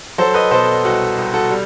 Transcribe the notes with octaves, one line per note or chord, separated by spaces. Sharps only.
F#3 A4 C5
B4 D#5
B2 A4 C5
C2 F#4 A4
C2
F#4 A4
G3